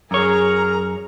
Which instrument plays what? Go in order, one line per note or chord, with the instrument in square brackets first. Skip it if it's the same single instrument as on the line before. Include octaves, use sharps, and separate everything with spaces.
[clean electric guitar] F#2 C#5 [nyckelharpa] G#4 [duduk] A#4 [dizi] A#5